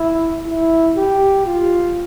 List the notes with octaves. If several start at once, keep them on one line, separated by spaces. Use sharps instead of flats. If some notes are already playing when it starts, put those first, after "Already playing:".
Already playing: E4
E4
G4
F4